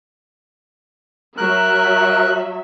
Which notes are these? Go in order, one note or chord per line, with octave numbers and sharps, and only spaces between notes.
F#3 A#4 E5 F#6